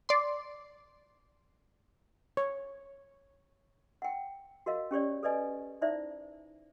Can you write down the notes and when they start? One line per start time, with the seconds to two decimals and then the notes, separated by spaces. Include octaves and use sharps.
0.09 D5 C6
2.37 C#5
4.02 F#5 G5
4.66 F#4 A#4 D#5 F5
4.91 C#4 G4 C#5 D5
5.23 A4 B4 D5 D#5 G#5
5.81 D#4 E4 C5 D5 E5